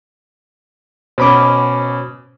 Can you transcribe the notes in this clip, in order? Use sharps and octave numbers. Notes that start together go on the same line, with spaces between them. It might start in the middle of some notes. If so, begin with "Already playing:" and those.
B2 C#4 C5 B5 D6